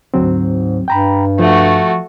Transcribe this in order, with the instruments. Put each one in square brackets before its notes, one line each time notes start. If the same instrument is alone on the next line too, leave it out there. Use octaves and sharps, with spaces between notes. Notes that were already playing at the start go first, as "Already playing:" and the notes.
[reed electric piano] D2 F#3 C4 [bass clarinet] G#2
[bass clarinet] G2 [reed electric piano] G5 A#5 B5
[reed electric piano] F3 [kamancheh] A3 F#4